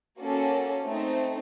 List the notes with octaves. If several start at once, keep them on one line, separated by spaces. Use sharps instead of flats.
A#3 C#4 F#4 A4
A3 C4 D#4